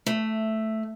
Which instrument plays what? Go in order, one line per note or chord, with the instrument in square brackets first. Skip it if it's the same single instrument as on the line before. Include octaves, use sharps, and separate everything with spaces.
[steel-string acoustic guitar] A3